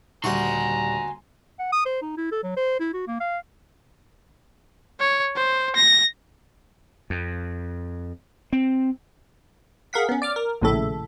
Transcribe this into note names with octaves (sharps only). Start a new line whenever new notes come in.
D#1 D2 G3 F#5 G#5 A#5 C6 C#6
F#5
D#6
C5
D#4
E4
A4
F#3
C5
E4
F#4
A#3
F5
C#5
C5
A#6
F2
C4
G#4 A#4 F5 F#5 B6
B3 C#4
D5 D6 F6
A#4
A#1 D#2 A2 C#3 A4 E5